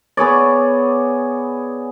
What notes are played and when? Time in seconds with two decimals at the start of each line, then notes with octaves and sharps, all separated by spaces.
0.17 B3 G#4 C#5 D5